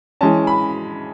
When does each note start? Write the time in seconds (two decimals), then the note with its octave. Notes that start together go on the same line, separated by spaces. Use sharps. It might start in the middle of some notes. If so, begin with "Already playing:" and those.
0.21 E3 G#3 C#4 A5
0.47 B5